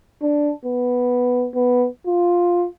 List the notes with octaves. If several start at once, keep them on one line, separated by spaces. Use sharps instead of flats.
D4
B3
B3
F4